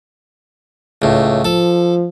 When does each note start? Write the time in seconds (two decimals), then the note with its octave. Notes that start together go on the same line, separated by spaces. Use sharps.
1.02 C#2 A2
1.45 F3 A4